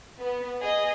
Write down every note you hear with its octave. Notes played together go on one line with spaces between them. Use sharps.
B3
G#4 D#5